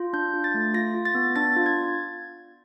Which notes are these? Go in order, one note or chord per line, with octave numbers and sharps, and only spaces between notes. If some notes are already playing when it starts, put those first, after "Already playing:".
Already playing: F4
D4 G6
F4
A6
A3
F4 A#6
F4
A6
B3
D4 A6
F4
G#6